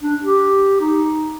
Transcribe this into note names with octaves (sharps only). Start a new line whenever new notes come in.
D4
G4
D#4